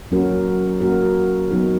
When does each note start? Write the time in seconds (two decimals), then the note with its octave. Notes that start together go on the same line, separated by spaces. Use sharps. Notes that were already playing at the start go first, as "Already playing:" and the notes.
0.12 F#3 A#3 C#4 F#4 A#4
0.80 F#3 A#3 C#4 F#4 A#4
1.51 F#3 B3 D#4 A#4